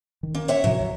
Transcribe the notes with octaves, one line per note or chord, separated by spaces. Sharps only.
D#3
A#3 C#4
C#5 E5 F#5
A2 C3 F3 F#3
D2